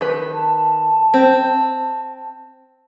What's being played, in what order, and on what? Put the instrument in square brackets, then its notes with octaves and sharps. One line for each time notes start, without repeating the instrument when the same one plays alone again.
[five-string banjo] D#3 B4
[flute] A5
[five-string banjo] C4